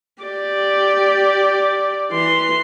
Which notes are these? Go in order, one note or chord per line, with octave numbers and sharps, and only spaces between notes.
G4 D5
E3 C6